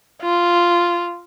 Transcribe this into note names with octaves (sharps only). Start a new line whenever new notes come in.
F4